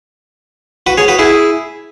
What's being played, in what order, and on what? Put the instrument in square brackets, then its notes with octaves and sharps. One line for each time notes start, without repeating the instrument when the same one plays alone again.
[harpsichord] F#4 B4
G#4 C#5
F#4 B4
E4 G#4